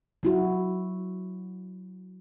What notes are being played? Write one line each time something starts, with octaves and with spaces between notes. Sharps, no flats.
F#3 E4 F#4